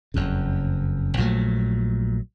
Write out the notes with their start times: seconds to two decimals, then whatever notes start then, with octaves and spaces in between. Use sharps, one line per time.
0.14 F#1 F2 C#3
1.17 A#1 A#2 F#3 A3